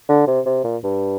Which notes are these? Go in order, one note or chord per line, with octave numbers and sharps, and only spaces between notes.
D3
C3
C3
A#2
G2